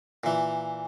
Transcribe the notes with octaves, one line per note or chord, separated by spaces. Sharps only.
A#2 E3